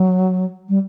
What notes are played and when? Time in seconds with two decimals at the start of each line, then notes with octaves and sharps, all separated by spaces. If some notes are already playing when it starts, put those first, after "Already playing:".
Already playing: F#3
0.69 G3